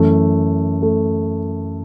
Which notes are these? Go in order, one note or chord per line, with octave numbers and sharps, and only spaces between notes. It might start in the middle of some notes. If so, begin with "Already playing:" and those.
Already playing: F#2 E3 A3
A3